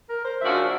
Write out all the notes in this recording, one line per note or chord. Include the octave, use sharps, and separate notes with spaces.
A#4
C5
C#3 F3 A#3 D4 F#4 E5